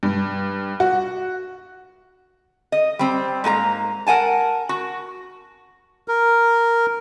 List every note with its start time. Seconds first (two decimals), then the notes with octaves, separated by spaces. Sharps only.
0.03 G2
0.80 F#4
2.72 D#5
2.99 G3 C4
3.44 G#2 A#3 A4 A#5
4.07 A#4 F#5 G#5 A5
4.69 F#4
6.08 A#4